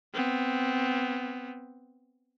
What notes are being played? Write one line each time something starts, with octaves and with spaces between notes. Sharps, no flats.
B3 C4